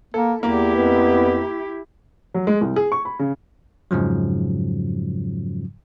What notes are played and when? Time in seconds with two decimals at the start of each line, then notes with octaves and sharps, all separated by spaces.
0.14 A#3 A4
0.43 E2 A#3 E4 G4
0.75 F2 B3
2.34 F#3
2.47 G#3
2.61 C2
2.76 G#4
2.92 C#6
3.05 B5
3.19 C#3
3.91 F2 G#2 C#3 F3 F#3